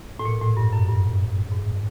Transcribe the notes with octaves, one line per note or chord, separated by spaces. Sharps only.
A2
A#2
A2
G2
F#2
G2
G#2